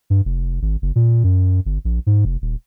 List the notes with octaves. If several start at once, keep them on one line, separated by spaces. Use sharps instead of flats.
G2
F1
G#1
F#1
A#2
F#2
G1
A#1
G#2
F1
D#1